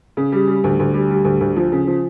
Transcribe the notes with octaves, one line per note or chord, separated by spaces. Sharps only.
C#3
G3
G3
D2
D2
G3
G3
D2
D2
F3
C#3
F3